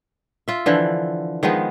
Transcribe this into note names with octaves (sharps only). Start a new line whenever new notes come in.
F4 E5
D3 E3 F3
D#3 F3 G#3 B3